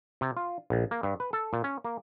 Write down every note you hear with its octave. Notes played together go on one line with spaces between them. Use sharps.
C3
F4
A#1
A#3
G2
B4
A4
A#2
C#4
A#3